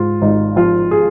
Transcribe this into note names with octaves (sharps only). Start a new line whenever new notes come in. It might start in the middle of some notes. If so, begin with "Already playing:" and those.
Already playing: G#2 F4
G#1 D#4
F3 F4
G#4